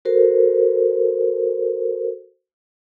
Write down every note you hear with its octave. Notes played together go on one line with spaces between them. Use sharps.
F#4 A4 A#4 C5